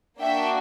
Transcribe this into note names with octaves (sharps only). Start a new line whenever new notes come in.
A#3 D4 F#4 E5 G5